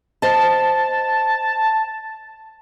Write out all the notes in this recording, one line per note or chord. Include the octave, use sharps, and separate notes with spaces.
C5 D#5 A5